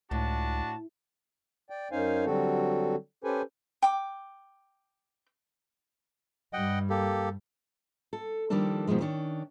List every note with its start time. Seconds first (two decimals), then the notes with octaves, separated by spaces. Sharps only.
0.11 C#2 A2 D4 F#4 A5
1.70 D5 G5
1.92 F#2 C#4 D#4 C5 F5 G#5
2.25 D3 F#3 G3 C4 F#4 A4
3.24 C#4 G4 A4 B4 C5 G#5
3.82 G5 D6
6.53 G2 G3 D#5 F#5 G5
6.90 A#3 G4 A4
8.13 A4
8.50 D#3 F3 G3 A#3 D4 A4
8.87 G#2 B2 D#3 F3 G#3
9.01 D#3 C#4 D4